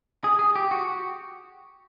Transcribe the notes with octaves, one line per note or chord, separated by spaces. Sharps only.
G#4
G#4
G4
F#4